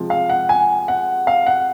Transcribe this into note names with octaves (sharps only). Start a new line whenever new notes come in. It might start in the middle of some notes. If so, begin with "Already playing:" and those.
Already playing: C3 F3 G#3
F5
F#5
G#5
F#5
F5
F#5